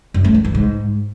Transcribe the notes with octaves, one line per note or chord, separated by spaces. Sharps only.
F#2
A3
E3
E3
G#2